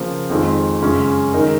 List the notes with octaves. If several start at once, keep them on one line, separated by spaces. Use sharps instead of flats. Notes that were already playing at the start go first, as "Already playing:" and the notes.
Already playing: C#3 F3 A#3
F2 D#3 G#3 C4 F4
F#2 C#3 G#3 C#4 F4
D#3 G#3 D#4 A#4